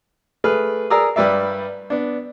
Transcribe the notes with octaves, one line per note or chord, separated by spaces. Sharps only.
A3 G#4 B4 F6
G#4 A#4 D5 A#5 D#6 E6
G2 G3 B4 D5 E5
B3 D4